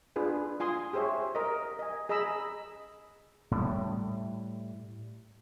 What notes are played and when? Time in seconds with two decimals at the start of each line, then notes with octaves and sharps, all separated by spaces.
0.16 D4 F4 G#4 B4
0.60 F4 G#5 C6 D#6
0.93 G4 G#4 C5 C#5 E5
1.35 A#4 D#5
1.79 D#5 G#5
2.09 G#4 D#5 A#5 B5 E6
3.51 A2 G3